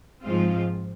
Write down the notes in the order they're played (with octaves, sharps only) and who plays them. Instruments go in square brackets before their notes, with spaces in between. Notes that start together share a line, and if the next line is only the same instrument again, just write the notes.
[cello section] G#2 F3 G#3 C4 F4